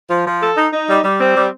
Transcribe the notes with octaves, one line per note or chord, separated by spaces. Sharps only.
F3
F3
A4
D#4
D#4
G3
G3
C4
G3